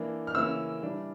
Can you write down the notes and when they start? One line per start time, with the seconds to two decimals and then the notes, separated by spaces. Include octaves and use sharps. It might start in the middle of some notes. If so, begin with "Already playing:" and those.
Already playing: E3 A#3 D4
0.27 F6
0.35 C#3 E3 A#3 C#4 E6
0.82 E3 G3 D4